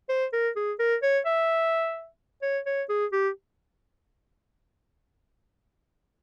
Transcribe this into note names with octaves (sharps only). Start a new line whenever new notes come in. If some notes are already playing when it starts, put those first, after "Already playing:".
C5
A#4
G#4
A#4
C#5
E5
C#5
C#5
G#4
G4